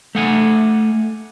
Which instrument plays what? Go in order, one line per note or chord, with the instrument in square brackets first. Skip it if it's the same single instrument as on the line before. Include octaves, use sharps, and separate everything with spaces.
[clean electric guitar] A3 F#5 G#5